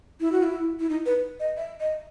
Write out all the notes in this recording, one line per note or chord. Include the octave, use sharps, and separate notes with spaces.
E4
F#4
E4
E4
D#4
B4
D#5
E5
D#5